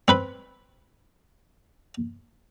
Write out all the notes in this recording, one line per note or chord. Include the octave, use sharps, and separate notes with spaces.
C4 B4 B5